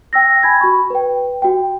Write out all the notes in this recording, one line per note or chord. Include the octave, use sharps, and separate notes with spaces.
G5 E6 A#6
G#5 B5 G#6
F#4 B5 C#6
B4 G5
F#4 G5